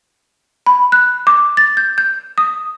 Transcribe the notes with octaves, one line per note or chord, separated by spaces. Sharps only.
B5
F#6
D6
A6
G6
G6
D#6